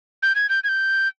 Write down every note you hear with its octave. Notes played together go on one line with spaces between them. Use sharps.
G6
G#6
G6
G#6
G6